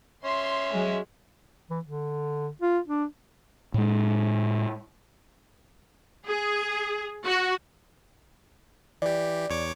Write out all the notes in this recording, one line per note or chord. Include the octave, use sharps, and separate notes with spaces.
C#4 E5 C6
F#3 G#3
E3
D3
F4
D4
A2 G#3
G#4
F#4
E3 G4 D5
E2 C#5 D6